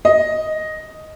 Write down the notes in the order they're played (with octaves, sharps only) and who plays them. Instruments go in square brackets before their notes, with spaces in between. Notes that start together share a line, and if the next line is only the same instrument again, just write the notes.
[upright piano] D#5